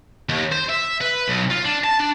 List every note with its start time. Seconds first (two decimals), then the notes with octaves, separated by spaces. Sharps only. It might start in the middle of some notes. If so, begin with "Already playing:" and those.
0.29 D#2
0.52 C5
0.69 E5
1.01 B4
1.28 B1
1.51 F4
1.65 D4
1.84 A5
2.00 D4